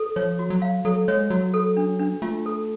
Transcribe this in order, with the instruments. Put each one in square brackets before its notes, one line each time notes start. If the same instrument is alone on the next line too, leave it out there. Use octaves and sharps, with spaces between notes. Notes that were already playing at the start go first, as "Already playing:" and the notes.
Already playing: [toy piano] A4
[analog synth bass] F3 [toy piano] C#5
[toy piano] F#4
[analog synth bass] F#3
[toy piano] F5
[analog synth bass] F#3 [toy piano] A4
[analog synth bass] G#3 [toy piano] C#5
[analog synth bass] F#3 [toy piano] F#4
[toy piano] A4
D4
D4
[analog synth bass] A3 [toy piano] F4
[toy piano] A4